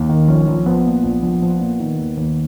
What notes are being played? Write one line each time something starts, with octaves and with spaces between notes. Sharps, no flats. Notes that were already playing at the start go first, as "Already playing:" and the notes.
Already playing: D#2
D#3
A#1 C#4
A#1
F3 B3
A#2
A#1
A#1
F3
A#2
D#3
D#2
D#2